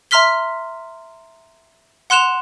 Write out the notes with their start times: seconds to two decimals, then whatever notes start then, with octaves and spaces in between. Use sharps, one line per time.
0.11 E5 A#5 C6 F6 B6 G7
2.10 F#5 C6 F#6 E7 F7